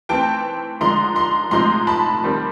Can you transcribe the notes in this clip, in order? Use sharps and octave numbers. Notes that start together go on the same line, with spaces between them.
E3 A3 C4 G5 A5
D3 F3 G#3 A#5 C6
A#5 C6
A2 F3 G#3 C4 A#5 C6
A5 B5
D#3 G3 C4